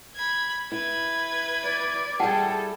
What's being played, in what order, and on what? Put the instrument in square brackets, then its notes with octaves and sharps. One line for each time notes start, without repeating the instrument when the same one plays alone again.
[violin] B5 G#6
[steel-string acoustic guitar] E4 [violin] B4 G#6
[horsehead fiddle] D5
[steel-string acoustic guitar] G3 E4 [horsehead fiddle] G#4 A4 [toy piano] F#5 G5 A5